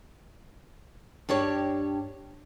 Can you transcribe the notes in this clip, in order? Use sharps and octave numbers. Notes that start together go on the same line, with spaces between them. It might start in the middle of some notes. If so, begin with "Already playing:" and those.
G2 D4 G4 C#5